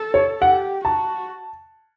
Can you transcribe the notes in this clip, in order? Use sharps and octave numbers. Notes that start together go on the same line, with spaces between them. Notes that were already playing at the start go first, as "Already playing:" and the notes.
Already playing: A4
C#5
G4 F#5
F#4 A5